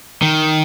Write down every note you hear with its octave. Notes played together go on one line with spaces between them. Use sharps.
D#3